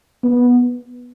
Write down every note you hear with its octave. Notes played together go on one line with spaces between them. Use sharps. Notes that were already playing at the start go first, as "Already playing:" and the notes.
B3